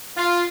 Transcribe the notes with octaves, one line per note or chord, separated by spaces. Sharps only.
F4